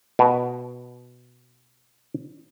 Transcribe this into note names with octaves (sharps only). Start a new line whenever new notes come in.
B2 B4